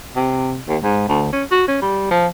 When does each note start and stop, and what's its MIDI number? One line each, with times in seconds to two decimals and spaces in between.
0.15 0.58 48
0.68 0.77 39
0.82 1.05 44
1.08 1.27 38
1.32 1.44 61
1.51 1.66 66
1.68 1.81 61
1.82 2.11 55
2.11 2.27 53